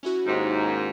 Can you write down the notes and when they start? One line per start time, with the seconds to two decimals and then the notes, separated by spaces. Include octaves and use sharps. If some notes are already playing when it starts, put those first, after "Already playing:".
0.03 C#4 E4 F#4
0.27 D#2 G#2